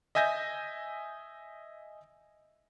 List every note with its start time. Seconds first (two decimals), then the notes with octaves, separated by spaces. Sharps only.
0.15 D#5 E5 G#5 G6 A#6